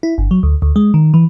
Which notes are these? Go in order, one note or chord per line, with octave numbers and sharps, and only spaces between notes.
E4
G1
F#3
D2
D2
G#3
D#3
E3